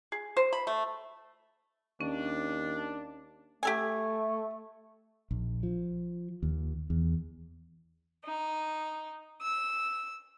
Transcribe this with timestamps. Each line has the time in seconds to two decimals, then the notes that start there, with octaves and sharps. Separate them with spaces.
0.12 G#4
0.37 C5
0.53 B5
0.67 A3
2.01 D#2 C#4 D4
3.63 A3 G4 A4 G#5
5.31 A#1
5.63 F3
6.43 D#2
6.90 E2
8.25 D#4
9.42 E6